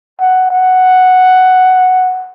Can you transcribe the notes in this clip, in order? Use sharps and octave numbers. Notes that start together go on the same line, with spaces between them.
F#5
F#5